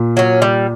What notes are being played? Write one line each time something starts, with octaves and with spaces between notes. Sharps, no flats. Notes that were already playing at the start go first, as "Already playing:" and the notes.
Already playing: A#2
F#3 C#4
G3